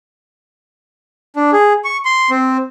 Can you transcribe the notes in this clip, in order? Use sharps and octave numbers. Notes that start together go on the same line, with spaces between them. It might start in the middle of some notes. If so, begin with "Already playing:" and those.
D4
G#4
C#6
C6
C4